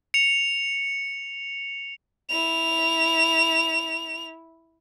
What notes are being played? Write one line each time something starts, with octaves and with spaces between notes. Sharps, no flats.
C#7 F7
E4 F7